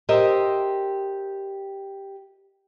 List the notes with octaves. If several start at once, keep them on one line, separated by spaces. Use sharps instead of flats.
G4 A#4 C5 D#5 E5